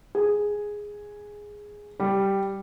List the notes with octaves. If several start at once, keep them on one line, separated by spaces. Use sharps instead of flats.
G#4
G3